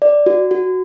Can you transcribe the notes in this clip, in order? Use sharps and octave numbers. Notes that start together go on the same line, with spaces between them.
D5
F#4
F#4